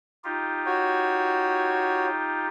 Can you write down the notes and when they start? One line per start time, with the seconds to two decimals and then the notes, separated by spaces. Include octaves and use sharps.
0.24 D#4 F4 G4
0.66 F#4 C#5